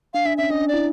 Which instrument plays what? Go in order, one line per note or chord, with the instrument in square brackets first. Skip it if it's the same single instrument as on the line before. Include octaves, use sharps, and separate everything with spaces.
[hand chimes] D4 [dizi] F5
[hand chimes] D4 [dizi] E5
[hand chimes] C#4 [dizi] E5
[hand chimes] D4 [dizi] D#5
[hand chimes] D4
[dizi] D5
[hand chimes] E4